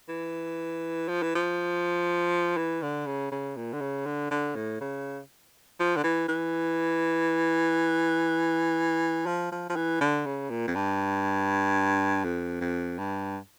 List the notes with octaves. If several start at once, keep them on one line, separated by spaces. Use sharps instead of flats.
E3
F3
E3
F3
E3
D3
C#3
C#3
A#2
D3
C#3
D3
D3
A2
C#3
F3
D3
E3
E3
F3
F3
F3
E3
D3
C#3
A#2
F2
G2
F2
F2
G2